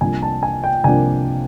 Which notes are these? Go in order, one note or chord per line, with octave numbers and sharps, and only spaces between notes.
C2 C3 F3 A#3 D4 G#5
A5
G#5
G5
C2 C3 F3 A#3 D4 G#5